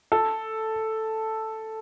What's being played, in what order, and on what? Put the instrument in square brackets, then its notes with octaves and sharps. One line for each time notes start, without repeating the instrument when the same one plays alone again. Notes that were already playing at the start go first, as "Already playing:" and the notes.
[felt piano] A4